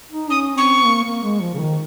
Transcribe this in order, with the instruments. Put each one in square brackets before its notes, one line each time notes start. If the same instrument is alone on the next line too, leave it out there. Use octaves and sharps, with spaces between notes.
[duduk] D#4
[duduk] C#4 [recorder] D#6
[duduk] C4 [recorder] C#6
[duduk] A#3
A#3
G#3
F3
C#3
D#3